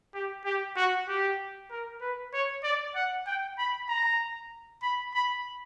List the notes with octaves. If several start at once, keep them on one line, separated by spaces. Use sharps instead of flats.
G4
G4
F#4
G4
A#4
B4
C#5
D5
F#5
G5
B5
A#5
B5
B5